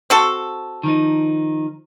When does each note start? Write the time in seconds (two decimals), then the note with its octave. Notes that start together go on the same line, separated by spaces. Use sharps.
0.10 C4 F#4 A4
0.83 D#3 F3 D#4